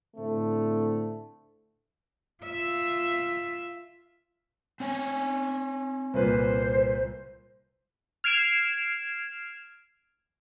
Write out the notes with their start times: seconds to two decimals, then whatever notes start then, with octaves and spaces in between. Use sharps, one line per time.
0.16 A2 D3 A3 C4 A4
2.43 F4 E5
4.80 C4 C#5 G#5
6.14 C2 A#2 B4 C5
8.24 F6 G#6 C7 D7 E7